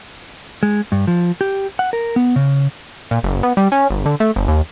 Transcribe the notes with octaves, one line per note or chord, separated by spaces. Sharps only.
G#3
G2
F3
G4
F#5
A#4
B3
C#3
A#2
F#1
B3
G3
C#4
G1
D3
A3
G1
D#2